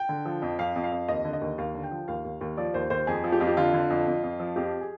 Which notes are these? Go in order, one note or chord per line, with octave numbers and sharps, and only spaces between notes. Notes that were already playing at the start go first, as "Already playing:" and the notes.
Already playing: G5
D3
F3
F2
F2 F5
F2
F5
F2
D#2 D#5
D3
D#5
D#2
D#2 F5
D3
G5
F3
D#2 F5
D#2
D#2
F3 D5
D#2 C5
D#2 C5
F2 G#4
F3
G4
F2 F4
G4
D3 F4
D3
F2
F2
F2
F3
F2 G4
G#4